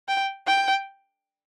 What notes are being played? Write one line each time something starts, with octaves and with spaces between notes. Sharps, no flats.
G5
G5